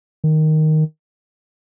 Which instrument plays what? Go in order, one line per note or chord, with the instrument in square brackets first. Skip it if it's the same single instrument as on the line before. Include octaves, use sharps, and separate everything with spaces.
[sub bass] D#3